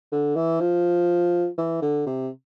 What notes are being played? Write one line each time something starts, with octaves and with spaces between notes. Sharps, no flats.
D3
E3
F3
E3
D3
C3